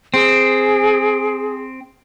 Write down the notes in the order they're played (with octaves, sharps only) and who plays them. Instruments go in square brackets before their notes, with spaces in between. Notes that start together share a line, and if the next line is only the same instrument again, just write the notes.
[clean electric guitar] C4 [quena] G#4